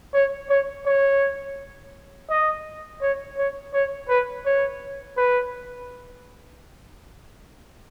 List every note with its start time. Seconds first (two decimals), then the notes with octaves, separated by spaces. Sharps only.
0.14 C#5
0.49 C#5
0.86 C#5
2.30 D#5
3.02 C#5
3.37 C#5
3.73 C#5
4.09 B4
4.45 C#5
5.17 B4